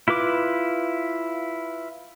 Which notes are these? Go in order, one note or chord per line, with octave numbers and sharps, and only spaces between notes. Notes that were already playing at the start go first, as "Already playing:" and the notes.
E4 F4 B4 D6